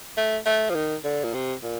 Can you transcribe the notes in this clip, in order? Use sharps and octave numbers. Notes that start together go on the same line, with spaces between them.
A3
A3
F3
D#3
D3
A#2
C3
A#2